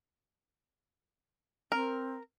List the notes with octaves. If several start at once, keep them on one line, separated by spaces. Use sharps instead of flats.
C4 A#4